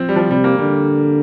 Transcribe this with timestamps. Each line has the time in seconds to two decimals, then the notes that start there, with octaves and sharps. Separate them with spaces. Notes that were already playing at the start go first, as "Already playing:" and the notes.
Already playing: F3 C4
0.09 G3
0.16 F3
0.30 C3 G3
0.44 A#3
0.58 D3 G3